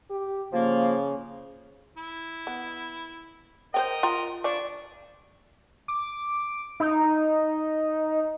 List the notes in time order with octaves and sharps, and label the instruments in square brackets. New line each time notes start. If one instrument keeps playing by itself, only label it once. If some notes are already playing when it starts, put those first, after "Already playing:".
[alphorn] G4
[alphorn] C#3 [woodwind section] F3 A#3
[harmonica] E4
[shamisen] B3
[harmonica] A#4 D#5 [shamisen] C5 C#5 G5
[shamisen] F4 G5 A#5
[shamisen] F3 D5 [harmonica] D4 C#6
[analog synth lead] D6
D#4